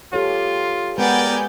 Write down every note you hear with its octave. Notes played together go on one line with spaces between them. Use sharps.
F4 G4 A4 C#5
G#3 B3 A#4 D5 G5 G#5 G6